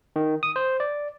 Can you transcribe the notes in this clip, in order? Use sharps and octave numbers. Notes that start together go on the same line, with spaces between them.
D#3
D#6
C5
D5